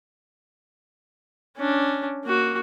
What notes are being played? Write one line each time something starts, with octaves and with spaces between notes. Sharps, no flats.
C#4 D4
A#3 F#4